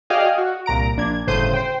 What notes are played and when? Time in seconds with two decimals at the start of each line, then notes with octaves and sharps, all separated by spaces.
0.10 F#4 G#4 D5 D#5 F5 G5
0.38 F#4
0.66 C2 A#2 A#5 D7
0.96 A#1 D4 G#6
1.27 G1 A2 C#3 C5 G6 D#7
1.54 C5 G5